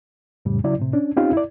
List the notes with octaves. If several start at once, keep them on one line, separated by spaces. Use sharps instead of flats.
F2 A2 C#3 G3
C#3 F#3 E4 D5
A2 C3
C#4 D4
C4 C#4 D#4 F4 G4 F5
E4 D5